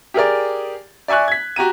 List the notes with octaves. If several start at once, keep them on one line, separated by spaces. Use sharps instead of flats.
G4 G#4 A#4 D5
D5 E5 G#5 C#6 F#6
G#6 B6
F#4 G4 A#5 D#7